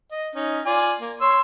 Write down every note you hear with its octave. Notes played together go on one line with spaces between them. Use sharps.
D#5
C#4 D#4
F4 D5 G#5
A#3
C#5 C6 E6